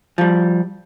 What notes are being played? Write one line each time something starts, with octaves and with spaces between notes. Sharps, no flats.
F3 G3